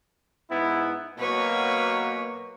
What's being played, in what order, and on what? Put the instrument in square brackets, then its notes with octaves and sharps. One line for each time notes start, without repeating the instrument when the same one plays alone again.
[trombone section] G#2 B3 E4
[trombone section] B2 F#3 A#3 [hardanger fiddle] B4 C#5